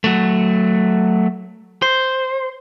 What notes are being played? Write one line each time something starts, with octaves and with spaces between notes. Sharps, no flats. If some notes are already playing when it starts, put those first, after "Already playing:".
F#3 A3
C5